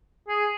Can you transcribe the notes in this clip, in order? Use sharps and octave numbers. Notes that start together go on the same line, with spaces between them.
G#4